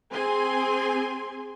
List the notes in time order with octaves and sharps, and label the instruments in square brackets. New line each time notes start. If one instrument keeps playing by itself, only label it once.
[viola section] C4 G#4 G#5 C6